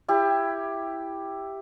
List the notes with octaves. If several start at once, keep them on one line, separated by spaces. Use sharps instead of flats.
E4 G4